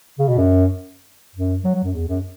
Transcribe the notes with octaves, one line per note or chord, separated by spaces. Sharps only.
C#3
B2
F#2
F#2
F#3
F#3
F#2
E2
F#2